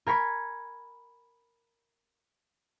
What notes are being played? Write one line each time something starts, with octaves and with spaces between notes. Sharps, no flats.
A#4 G#5 B5 C#6